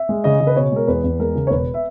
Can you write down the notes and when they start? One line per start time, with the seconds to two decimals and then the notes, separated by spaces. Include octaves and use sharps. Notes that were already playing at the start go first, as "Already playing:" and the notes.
Already playing: E5
0.09 G#3
0.24 C#3 D#5
0.40 C#3
0.47 B4
0.56 B2 C#5
0.72 G#3 A#4
0.88 E2 B4
1.04 E2
1.20 G#3 A#4
1.35 C#3
1.47 C#5
1.50 E1 B4
1.74 E5